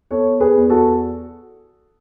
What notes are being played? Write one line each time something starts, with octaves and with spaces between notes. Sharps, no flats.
B3 A4 C#5
G#4 B4
E2
F#4 A4